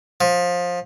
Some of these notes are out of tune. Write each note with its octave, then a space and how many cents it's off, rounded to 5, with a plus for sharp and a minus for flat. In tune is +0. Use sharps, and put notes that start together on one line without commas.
F3 +20